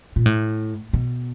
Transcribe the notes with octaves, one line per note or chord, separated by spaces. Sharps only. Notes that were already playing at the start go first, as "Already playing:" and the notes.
A#2
A2
B2